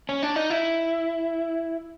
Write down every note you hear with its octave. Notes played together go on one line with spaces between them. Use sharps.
C#4
D4
D#4
E4